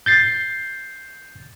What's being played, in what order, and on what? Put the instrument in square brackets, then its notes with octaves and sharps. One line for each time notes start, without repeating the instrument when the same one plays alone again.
[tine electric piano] G6 A6 C7